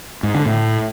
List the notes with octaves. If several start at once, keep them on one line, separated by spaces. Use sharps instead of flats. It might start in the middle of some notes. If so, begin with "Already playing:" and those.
G#2
D3
A2